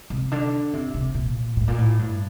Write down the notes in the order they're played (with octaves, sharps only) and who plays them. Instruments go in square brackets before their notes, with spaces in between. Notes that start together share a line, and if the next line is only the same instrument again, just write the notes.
[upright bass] C3
D3
C3
C3
A#2
A2
A#2
A2
G2